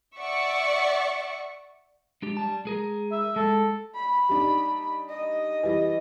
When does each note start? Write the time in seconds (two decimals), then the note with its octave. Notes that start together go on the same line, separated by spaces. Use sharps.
0.18 D5 E5 F#5 C#6
2.22 G#3 D4 G4
2.37 G3 A5
2.65 G#3 G#4 A#4
3.11 E5
3.36 G#3 A4
3.95 B5
4.29 G3 D4 D#4
5.09 D#5
5.63 E3 G3